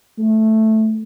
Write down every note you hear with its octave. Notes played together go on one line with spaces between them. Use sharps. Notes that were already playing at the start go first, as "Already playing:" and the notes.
A3